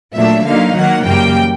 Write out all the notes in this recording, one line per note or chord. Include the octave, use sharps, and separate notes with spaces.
A#2 F#3 A3 D4 E5
D3 F#3 A#3 D#4 F5
D#3 F#3 A#3 F#5
F#2 C#3 E3 G3 A#3 G5